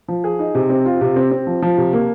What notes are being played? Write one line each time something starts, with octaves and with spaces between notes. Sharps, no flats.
F3
G#4
D#4
C3
C4
F4
C3
C4
C4
F3
F3
C3
A#3